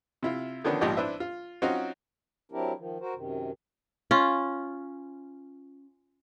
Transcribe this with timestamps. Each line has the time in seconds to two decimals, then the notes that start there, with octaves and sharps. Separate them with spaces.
0.23 C3 E4 F4
0.64 D3 D#3 F3 B3 C#4 D4
0.81 G#1 A#2 F3 G4 D5 D#5
0.97 D4 E4 B4 C5 E5
1.20 F4
1.62 F#3 C4 C#4 D#4 F4 F#4
2.52 F#3 C4 D4 E4 G4 A#4
2.77 D#3 F3
3.00 F#4 A#4 C5
3.14 F#2 C3 D#3
4.11 C#4 F4